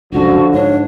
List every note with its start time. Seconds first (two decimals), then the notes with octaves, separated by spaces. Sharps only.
0.12 F1 C#2 F#2 D3 F3 F#4
0.54 G#2 D4 C#5